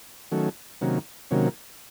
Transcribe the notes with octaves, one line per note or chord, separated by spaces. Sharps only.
D#3 F#3 A3 C#4
C3 D#3 F#3 A#3 C#4
C3 D#3 F#3 A#3 C#4